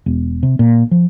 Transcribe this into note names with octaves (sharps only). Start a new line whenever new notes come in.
E1
C3
A#2
F3